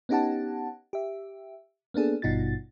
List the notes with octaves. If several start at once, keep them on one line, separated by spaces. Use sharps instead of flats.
B3 C#4 D#4 G4 F#5 A5
G4 E5
A#3 B3 D4 G#4 A4
G#1 G2 B2 D#4 F4 A6